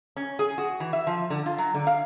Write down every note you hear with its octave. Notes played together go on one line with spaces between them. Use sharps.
C#4
G#4
F#4
E3
E5
F3
D3
F4
F#3
D3
F5